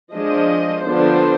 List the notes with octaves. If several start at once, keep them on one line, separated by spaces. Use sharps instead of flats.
F3 G#3 D4 D#5
D3 F3 B3 D4 C5